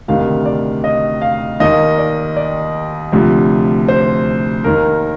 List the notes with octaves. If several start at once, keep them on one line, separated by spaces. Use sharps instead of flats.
D2 C3 D#3 F5
D5
D#5
F5
D#2 D#3 D#5
D5
D5
D2 C3 F3
C5
D#2 D#3 A#4